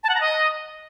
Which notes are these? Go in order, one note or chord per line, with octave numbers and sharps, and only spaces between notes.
A5
F#5
A#5
D#5